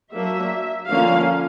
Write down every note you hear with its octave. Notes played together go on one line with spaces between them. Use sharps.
F#3 A#3 D4 E5
D3 F3 A#3 C#4 F5